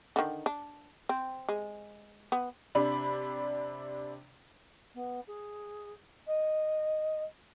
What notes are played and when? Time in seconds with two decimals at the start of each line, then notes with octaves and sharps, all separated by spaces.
0.16 D3 D#3
0.46 D4
1.09 C4
1.49 G#3
2.32 B3
2.75 C3 D4 B5
4.95 B3
5.27 G#4
6.27 D#5